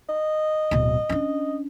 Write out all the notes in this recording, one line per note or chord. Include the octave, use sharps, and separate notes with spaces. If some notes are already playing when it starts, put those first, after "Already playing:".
D#5
D1 B2
C#4 D4